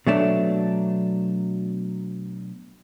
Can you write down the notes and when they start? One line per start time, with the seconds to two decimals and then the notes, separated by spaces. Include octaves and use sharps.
0.06 B2 F#3 A3 D4